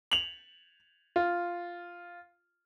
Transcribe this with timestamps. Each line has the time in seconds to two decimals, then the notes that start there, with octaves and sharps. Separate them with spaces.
0.11 F7 F#7
1.16 F4